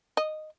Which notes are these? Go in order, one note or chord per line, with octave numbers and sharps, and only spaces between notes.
D#5